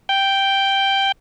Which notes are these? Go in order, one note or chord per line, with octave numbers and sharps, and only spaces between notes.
G5